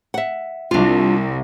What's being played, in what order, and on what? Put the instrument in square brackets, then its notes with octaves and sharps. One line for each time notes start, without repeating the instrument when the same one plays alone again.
[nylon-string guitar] E5 F#5
[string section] C2 [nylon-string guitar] D4 F4